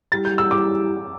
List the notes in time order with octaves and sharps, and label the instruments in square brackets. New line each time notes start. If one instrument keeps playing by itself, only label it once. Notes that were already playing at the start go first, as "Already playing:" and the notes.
[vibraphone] G3 E4 G4 [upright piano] A6
[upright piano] G6
E6
[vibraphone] G3 E4 G4 [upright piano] D6